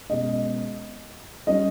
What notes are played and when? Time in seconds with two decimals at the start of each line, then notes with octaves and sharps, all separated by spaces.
0.09 B2 G#3 C#4 D#5
1.47 G3 C#4 D#5